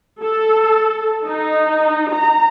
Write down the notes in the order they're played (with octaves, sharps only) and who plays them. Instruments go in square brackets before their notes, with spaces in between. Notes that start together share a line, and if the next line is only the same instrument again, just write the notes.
[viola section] A4
D#4
A#5